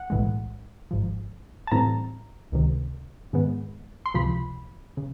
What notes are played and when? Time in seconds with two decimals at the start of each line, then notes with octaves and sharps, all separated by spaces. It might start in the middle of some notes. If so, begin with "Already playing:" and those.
Already playing: F#5
0.10 B1 A2 E3 G#3
0.91 G#1 G#2 F3
1.67 A5
1.71 A2 E3 G3 C4 A#5
2.52 C#2 C3 D#3
3.33 G#2 D#3 G#3 B3
4.06 C6
4.14 C#2 C3 F3 B5
4.97 C#3